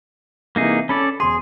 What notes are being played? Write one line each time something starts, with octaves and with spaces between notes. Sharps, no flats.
C3 E3 A#3 D#4 G#4
C#4 A4 D5 B5
E1 G#4 C6